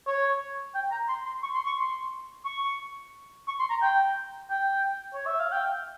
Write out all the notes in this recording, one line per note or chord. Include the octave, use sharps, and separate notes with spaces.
C#5
G5
A#5
C6
C6
C#6
C6
C#6
C6
C#6
C#6
C6
A#5
G5
G5
C#5
E5
F5
G5